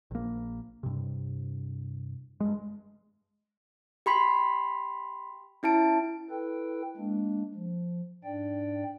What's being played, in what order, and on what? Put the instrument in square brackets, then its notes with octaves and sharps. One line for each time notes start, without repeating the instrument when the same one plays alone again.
[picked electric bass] A#1 A#3
G2 C3
G2 G#3
[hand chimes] G4 B5 C6 B6
C#4 E4 A5 D7
[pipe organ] E4 A4 B4 G5
G#3 A#3 D4
F3
G#2 D4 D5 G5